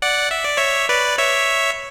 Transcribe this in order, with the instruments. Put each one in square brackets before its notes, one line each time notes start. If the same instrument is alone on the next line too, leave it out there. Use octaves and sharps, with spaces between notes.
[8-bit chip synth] D5 F#5
E5
D5
C#5 E5
B4 D5
C#5 E5